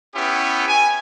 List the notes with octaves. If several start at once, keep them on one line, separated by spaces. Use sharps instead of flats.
B3 C#4 E4 G4
G#5